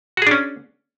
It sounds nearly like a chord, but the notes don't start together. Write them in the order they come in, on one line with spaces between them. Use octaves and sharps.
F#4 G#4 D4 C#4